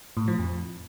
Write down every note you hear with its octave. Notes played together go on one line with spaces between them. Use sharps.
A2
F3
F2